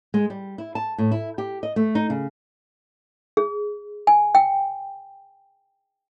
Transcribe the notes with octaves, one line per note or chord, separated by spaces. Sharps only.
G#3
G3
E4
A5
A2
E4
G4
D#5
A3
D#4
C#3
G#4
G#5
G5